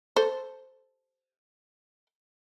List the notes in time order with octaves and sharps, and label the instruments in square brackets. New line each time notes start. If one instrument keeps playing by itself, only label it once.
[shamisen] A4 C5